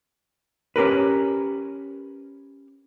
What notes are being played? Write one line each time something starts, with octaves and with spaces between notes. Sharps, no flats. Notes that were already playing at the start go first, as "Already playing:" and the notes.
C#4 G4 A#4 B4